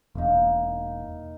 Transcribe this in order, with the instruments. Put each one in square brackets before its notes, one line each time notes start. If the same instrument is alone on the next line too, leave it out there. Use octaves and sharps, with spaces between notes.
[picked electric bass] E1 [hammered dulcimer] A#3 D#4